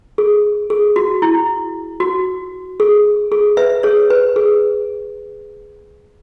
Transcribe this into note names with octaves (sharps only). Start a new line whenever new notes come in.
G#4
G#4
F#4
E4
F#4
G#4
G#4
B4 E5
G#4 C#5
B4
G#4